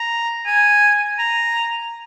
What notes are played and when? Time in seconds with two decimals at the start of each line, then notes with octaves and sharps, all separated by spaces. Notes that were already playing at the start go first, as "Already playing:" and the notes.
Already playing: A#5
0.46 G#5
1.19 A#5